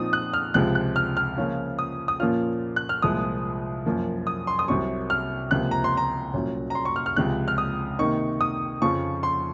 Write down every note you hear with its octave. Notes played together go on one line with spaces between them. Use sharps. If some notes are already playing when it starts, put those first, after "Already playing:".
Already playing: A#2 F3 C4 D#4 D#6
F#6
F6
C#2 C3 F3 G#3 F#6
F#6
F6
F6
C#3 F3 A#3 C#4 F4
D#6
D#6
A#2 F3 A#3 C#4 F4 F6
F#6
F6
C2 A#2 F3 G#3 D#6
F#2 F3 A#3
D#6
C6
D#6
C2 C3 F#3 C#6
F6
C#2 C3 F3 A#3 F#6
A#5
C6
A#5
C2 A#2 F#3 C#4
A#5
C6
C#6
F6
F6
C#2 C3 F3 G#3 F#6
F6
D#6
C3 D#3 A#3 D#4 C#6
D#6
F2 C#3 F3 C#6
C6